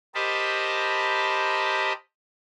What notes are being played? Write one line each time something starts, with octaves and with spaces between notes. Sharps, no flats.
G4 A#4 C5 D#5 A5 B5